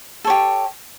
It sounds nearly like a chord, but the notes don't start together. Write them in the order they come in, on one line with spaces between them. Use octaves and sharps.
A4 C#5 G4